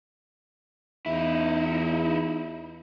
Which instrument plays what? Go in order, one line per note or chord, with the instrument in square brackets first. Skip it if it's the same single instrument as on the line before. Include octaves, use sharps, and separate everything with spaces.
[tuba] E2 [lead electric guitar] D#4 E4